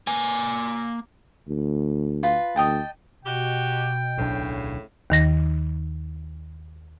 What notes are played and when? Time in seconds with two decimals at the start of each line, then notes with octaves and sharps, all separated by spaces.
0.07 A#3 G#5
1.49 D2
2.23 F4 B4
2.56 D2 D#5 G5 A5
3.25 B2 F#4 G4 G5
4.17 D1 B1 A2 C#3 D4
5.10 D#2 D#3 A#6